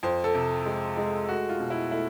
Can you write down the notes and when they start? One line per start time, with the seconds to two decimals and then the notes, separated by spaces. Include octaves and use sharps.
0.03 F2 C5
0.24 A4
0.34 C3
0.65 G#3
0.97 G#3
1.28 A3 F#4
1.49 F4
1.60 B2
1.70 E4
1.91 A3 E4